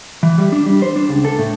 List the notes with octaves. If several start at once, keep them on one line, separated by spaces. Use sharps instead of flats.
E3
G3
D4
G3
C5
D4
C#2
A4
A2